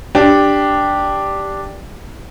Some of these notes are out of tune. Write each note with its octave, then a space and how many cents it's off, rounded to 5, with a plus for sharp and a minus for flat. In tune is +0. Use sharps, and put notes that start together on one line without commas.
D4 +0 G4 +0